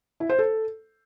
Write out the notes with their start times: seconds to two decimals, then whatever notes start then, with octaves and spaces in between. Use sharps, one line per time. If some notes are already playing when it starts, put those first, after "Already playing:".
0.20 E4
0.29 C5
0.39 A4